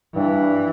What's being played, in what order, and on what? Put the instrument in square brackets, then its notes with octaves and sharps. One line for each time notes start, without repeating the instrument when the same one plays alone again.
[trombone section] G2 [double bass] E3